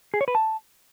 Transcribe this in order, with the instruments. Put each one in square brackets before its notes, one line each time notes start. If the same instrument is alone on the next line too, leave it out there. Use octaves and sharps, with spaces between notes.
[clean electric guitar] G#4
C#5
B4
A5